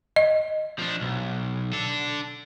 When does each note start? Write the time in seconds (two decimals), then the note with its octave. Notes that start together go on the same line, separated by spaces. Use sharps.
0.16 D#5
0.79 F3 D4
1.01 B1
1.73 D4 A4